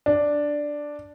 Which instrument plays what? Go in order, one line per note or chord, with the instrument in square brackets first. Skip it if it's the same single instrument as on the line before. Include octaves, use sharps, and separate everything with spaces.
[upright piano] D4